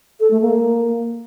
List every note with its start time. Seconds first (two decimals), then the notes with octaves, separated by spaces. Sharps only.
0.20 A4
0.31 A3
0.41 A#3